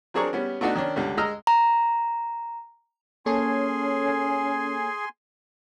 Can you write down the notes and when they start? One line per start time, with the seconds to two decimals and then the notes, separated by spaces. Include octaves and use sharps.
0.14 F#3 C4 D4 G#4 A#4 C#6
0.33 G3 B3 C#4
0.61 A3 B3 D4 D#4 F#4
0.76 D#3 C#4 D4
0.96 C#2 D3 G3
1.17 G#3 D#5 A#5 E6 F6
1.47 A#5
3.26 A#3 C#4 G#4 A4 C#5 G#5 C6